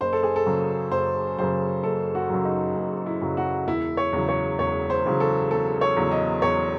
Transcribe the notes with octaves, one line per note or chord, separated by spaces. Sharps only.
F#1 C5
A4
G#4
A4
F#2 C#3 F#3
F#1 C5
F#2 C#3 F#3 C5
F#1 A4
F#4
F#2 C#3 F#3
D#4
F#1
E4
F#2 C#3 F#3
F#4
E1 E4
C#5
E2 C#3 F#3
C#5
E1 C#5
C5
E2 C#3 F#3
A4
E1 A4
C#5
E2 C#3 F#3
D#5
E1 C#5